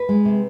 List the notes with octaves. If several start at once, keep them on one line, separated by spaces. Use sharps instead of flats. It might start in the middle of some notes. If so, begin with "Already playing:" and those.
Already playing: B4
G#3
C3